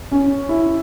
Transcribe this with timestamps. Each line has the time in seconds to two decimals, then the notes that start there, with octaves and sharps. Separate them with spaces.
0.11 C#4
0.49 E4